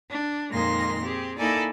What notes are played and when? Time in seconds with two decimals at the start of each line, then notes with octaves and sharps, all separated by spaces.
0.11 D4
0.51 F2 A#2 D#3 G#3 C6 A#6
1.03 C4 G4 G#4
1.38 A#3 D#4 E4 A4 D5 G#5